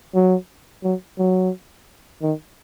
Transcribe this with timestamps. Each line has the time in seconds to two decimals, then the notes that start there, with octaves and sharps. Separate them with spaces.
0.14 F#3
0.84 F#3
1.18 F#3
2.22 D#3